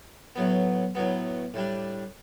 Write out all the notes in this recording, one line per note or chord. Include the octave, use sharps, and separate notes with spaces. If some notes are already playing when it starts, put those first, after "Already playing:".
A2 F#3 B3
A2 F#3 B3
A2 G3 D4